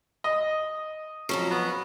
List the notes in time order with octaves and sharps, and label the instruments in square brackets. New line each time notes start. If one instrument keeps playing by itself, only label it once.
[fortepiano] D#5
[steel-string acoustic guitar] F2 G#2 F#3 [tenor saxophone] C#4
[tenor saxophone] B3